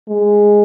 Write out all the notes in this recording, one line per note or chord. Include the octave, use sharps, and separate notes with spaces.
G#3